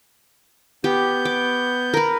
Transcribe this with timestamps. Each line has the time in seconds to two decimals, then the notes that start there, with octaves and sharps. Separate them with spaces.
0.84 B3 G4 G6
1.25 D6
1.94 A#4 B4